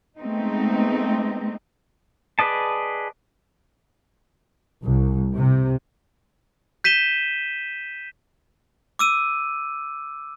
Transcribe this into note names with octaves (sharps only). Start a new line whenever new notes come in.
G#3 A3 B3 C4 D#4
G#4 B4 D5 D#5 A5
C2
C3
G6 B6 D#7 E7 G7
D6 E6 D#7